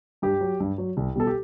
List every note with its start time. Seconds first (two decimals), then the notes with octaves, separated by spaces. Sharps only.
0.22 G2 G4
0.41 F#3
0.60 G2
0.78 F#3
0.97 C2
1.15 B2 G3 A4
1.27 G4